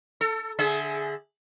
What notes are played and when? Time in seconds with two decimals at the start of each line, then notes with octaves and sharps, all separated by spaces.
0.21 A4
0.59 D3 G#4 E5